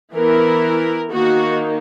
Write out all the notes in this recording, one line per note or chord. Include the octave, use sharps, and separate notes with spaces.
E3 B3 E4 A#4
D#3 A#3 D#4 F#4